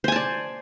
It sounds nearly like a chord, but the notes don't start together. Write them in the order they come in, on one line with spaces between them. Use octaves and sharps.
C5 G#5 A5 D5